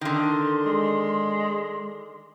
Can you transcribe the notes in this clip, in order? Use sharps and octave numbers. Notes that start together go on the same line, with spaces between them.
D3 D#3 C6
G#3